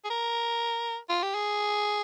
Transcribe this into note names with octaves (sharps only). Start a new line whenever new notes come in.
G#4
A#4
F4
G4
G#4